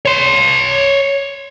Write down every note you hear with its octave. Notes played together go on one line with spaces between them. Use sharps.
C#5 C6